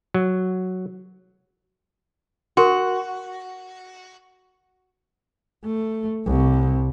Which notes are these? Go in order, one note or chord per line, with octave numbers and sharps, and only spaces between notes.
F#3
F#4 A#4 C6
A3
C2